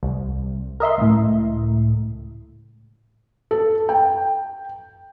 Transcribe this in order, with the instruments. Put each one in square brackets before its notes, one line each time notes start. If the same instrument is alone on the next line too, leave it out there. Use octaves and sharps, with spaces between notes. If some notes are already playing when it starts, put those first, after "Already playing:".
[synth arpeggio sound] C2
A#4 D#5 E5 C6
C#2 A2
[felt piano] A4
G5